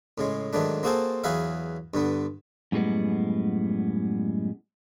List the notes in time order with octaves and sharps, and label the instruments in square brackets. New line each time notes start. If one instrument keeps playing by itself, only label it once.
[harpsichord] A2 C#3 G#3
G#2 D#3 F#3 A3 D4
A#3 C4 F#4 G#4 A4 C5
E2 F#3 G#4 B4 E5 F5
G2 D3 B3
[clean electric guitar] F#2 A2 G3 G#3 B3